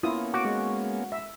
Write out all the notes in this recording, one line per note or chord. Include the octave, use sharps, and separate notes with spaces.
A#3 B3 C#4 E4 F4 D#6
F#4 D6
G#3
E5